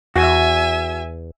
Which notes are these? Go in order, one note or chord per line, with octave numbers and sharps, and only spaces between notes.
E2 F#4 E5 G#5